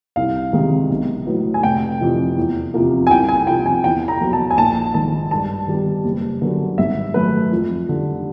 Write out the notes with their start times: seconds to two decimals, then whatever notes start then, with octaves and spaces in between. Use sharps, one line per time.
0.16 C2 F5
0.53 C3 D#3 G#3
0.90 B1
1.27 A2 F#3 B3
1.54 G#5
1.63 F1 G5
2.00 F2 C3 E3
2.36 E2
2.74 C3 F3 A#3
3.07 G#5
3.10 C2 G5
3.29 G#5
3.47 C3 F3 G5
3.66 G#5
3.84 E2 G5
4.08 A#5
4.20 B2 F#3 A#3
4.33 A5
4.51 G#5
4.57 A#1 A5
4.94 G#2 D#3 A5
5.31 G2 A5
5.68 D#3 G3 B3
6.04 F#1
6.41 F#2 D3 G3 B3
6.78 G#1 E5
7.14 F#2 D#3 F#3 A3 B4
7.52 F2
7.88 D3 G3